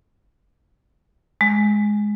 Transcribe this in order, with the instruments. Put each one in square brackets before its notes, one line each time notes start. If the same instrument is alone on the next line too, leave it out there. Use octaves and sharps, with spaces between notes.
[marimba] G#3